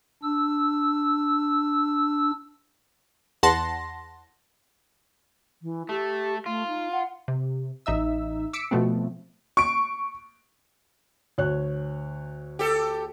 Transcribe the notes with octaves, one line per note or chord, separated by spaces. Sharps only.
D4 E6
E2 F#5 A5 C6 A#6
E3
A3 G4
A3 F4
D#4
F#5
C3
A1 D#4 E5 E6
D6 E6 B6 C#7 D7
B2 F3 A3 B3 C4
C#6 D7
D2 C#5 F#6
G4 A4